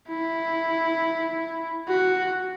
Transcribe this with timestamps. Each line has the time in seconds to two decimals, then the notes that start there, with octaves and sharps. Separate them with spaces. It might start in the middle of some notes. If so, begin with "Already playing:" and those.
0.09 E4
1.88 F#4